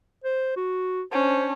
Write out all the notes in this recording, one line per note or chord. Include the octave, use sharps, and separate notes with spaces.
C5
F#4
C#4 D4 C5